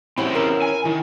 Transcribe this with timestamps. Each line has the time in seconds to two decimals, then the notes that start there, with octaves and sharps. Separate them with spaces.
0.18 E2 C4 C#4 E4 F#4 G4 B5
0.35 A#4 A#5 F6
0.62 G#5
0.85 D#3 E4